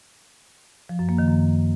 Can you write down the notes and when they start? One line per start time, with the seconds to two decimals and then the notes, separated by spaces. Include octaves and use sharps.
0.89 F3
0.99 F#2
1.09 A#3
1.18 D#3
1.28 F#2